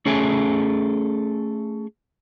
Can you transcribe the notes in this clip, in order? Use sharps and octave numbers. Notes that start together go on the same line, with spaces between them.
A3 C#4 G#4 A4 E5 G#5